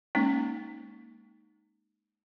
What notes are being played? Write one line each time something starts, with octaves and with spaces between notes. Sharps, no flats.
G#3 A#3 C#4 D#4